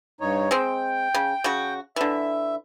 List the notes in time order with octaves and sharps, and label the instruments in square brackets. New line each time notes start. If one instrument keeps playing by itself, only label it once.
[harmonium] G2 D#4 C#5
[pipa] G#3 C4 [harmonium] G5
[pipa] C#3
C#3 F#4
[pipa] D3 E3 [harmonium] E5